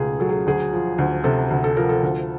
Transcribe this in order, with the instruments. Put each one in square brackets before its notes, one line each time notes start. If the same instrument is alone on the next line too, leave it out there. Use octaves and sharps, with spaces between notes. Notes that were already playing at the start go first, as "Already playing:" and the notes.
Already playing: [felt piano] C#2 B2 A3 G#4
F#3 A4
G#4
D2 G#4
F3
D2
C3 A4
D2
A4
F3 A#4
A4
D2